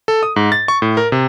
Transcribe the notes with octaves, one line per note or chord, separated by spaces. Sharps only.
A4
D#6
G#2
A6
C#6
A2
A#4
C3